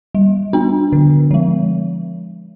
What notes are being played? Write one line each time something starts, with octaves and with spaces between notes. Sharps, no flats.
G3
B3 D4
D3
F3 G#3